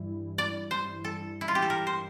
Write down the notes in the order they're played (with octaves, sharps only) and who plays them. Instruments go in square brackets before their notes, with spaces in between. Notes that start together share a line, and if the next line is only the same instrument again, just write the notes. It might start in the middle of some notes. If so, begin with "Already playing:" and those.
Already playing: [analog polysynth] G2 E3 G3 E4
[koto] D5
C5
A4
E4
F4
G4
A4
A#4
C5